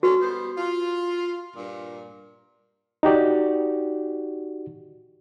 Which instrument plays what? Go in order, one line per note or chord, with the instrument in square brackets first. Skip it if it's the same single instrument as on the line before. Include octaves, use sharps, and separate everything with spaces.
[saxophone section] D3 A3 C#4 [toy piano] F#4
[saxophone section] G3 B3 C5
F4
G2 A#2
[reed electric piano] D#4 F#4 G4 D5